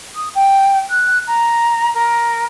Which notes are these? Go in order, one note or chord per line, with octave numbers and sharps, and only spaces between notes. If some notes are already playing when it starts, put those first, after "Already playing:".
D#6
G5
F#6
A#5
A#4